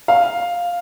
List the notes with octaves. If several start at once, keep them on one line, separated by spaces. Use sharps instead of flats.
F5